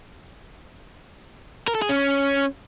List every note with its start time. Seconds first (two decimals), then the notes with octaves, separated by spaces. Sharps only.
1.68 A#4
1.75 A4
1.82 G#4
1.89 C#4